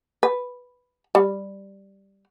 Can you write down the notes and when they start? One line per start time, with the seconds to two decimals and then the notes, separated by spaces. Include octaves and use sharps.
0.23 B4
1.15 G3